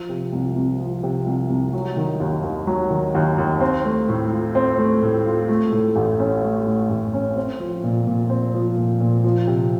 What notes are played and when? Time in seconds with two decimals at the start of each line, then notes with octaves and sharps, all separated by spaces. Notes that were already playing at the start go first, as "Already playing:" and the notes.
Already playing: F3
0.09 C3
0.32 C2
0.56 C2
0.80 F3
1.03 C3
1.26 C2
1.49 C2
1.73 F#3
1.97 D#3
2.20 D#2
2.44 D#2
2.67 F#3
2.90 D#3
3.15 D#2
3.38 D#2
3.61 C4
3.85 A3
4.09 A2
4.31 F4
4.55 C4
4.78 A3
5.02 A2
5.26 F4
5.48 A3
5.72 A2
5.96 A1
6.20 C#4
6.43 A3
6.66 A2
6.89 A1
7.14 C#4
7.36 C4
7.60 F3
7.84 A#2
8.07 A#2
8.30 C4
8.54 F3
8.77 A#2
9.00 A#2
9.24 F3
9.47 C3